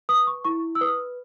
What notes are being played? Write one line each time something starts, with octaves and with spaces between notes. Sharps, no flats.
B4 D#6
C#6
E4 C#6
E6
B4 D#6